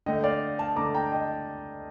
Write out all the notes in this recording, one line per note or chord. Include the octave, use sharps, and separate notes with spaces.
D3 A3 D#5 G5
D5 F5
F5 A5
D3 A3 A#5 D6
G5 A#5
D#5 G5